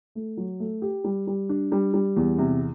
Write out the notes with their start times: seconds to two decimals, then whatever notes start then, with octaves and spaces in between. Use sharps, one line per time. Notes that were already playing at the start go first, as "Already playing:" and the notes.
0.15 A3
0.37 F#3
0.60 A3
0.82 G4
1.04 G3
1.27 G3
1.49 D4
1.72 G3
1.94 G3
2.16 E2
2.38 C3